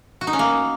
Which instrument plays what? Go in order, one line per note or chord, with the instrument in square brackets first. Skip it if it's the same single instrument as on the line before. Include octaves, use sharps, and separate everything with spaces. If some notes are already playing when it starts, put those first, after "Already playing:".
[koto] F#4
D#4
C#4
A#3